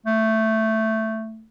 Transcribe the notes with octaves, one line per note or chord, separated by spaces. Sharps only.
A3